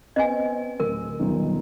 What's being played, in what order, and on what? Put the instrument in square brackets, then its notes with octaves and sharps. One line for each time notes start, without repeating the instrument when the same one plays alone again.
[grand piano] B3 C4 [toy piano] D#5 G#5
[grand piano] D1 [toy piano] A#4
[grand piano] D#1 B1 D#4